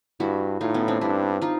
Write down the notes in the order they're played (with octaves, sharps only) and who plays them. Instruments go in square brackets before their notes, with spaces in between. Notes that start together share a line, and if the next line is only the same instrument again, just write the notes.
[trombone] G2 [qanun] E4 F#4
[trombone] A2 [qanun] D#4 F4
[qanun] B3 C#4
C4 D4
[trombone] G2 [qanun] D4 E4
[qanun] D#4 F4